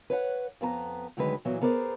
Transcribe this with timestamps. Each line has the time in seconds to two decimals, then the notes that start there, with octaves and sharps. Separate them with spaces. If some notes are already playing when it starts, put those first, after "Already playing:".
0.10 B4 C#5 D#5 F#5
0.61 F2 B3 A#4 A#5
1.17 D2 D3 D#3 F#3 G#3 B4
1.45 A#2 E3 F#3 B3
1.61 B3 G#4 A#4 C5 D5